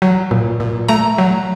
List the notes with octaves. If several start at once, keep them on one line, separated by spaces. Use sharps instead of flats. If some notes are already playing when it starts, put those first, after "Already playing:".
F#3
A#2
A#2
A3 A#5
F#3